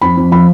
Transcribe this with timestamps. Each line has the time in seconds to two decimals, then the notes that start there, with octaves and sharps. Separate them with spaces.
0.02 F2 B5
0.17 F2
0.32 F3 B5